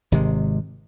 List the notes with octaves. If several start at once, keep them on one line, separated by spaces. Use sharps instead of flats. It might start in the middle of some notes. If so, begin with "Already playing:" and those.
G#1 C3 G#3